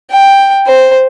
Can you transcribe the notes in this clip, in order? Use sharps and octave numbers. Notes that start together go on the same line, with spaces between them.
G5
C5